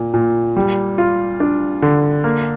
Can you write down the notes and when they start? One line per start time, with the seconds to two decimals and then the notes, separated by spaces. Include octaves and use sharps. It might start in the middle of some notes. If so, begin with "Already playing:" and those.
Already playing: A#2
0.14 A#2
0.56 G3
0.98 F4
1.40 D4
1.82 D3
2.24 A#3